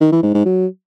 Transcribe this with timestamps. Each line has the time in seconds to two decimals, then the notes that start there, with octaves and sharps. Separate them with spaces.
0.01 D#3
0.12 E3
0.23 G#2
0.34 G#2
0.45 F#3